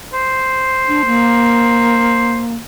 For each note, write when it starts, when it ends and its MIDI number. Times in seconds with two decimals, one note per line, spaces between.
0.14 2.45 72
0.88 1.02 62
1.06 2.55 58